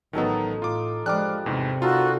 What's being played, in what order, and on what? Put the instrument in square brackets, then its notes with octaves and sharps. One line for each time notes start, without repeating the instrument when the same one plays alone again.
[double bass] A1 [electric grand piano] D#3 F#3 B3 [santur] D#4 A4 A#5
[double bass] A2 [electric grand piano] F4 D6
[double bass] F3 G#3 [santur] G3 D4 [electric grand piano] D6 F6 F#6
[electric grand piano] E2 G#2 [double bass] C3
[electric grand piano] D#4 F4 [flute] F#4 [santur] A4 A#4